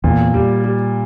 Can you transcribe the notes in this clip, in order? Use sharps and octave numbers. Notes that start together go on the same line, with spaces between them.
E2 A#2
G3
G3